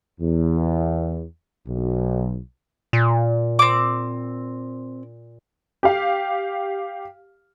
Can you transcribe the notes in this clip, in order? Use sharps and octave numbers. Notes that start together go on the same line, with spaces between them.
E2
B1
A#2
C4 D6
G4 F5